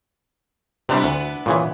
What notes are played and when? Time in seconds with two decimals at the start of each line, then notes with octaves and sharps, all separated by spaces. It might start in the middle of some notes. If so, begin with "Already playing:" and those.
0.89 C3 G3 B3 D4 E4
1.04 D2
1.46 A#2 C#3 E3